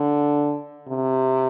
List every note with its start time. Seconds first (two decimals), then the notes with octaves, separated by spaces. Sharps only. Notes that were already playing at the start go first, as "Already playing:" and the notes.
Already playing: D3
0.88 C3